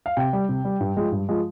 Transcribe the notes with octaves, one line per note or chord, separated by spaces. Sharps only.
F5
C3 G5
G3
C3
G3
G2
F3 G#3
G2
F3 G#3